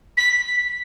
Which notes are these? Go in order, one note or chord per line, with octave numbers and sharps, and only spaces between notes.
B6